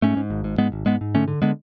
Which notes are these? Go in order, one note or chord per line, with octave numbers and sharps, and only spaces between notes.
G#2 A3 C#4
G#2
G#1
G#2
G#2 G#3 B3
G#1
G#2 G#3 B3
G#2
D3 A3 C#4
D3
D3 G#3 B3